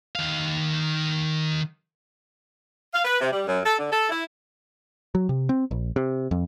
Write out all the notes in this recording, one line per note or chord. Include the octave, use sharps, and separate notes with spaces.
D#3 F5
F5
B4
C3
G3
F#2
A4
D3
A4
E4
F#3
C3
C4
A#1
C3
F2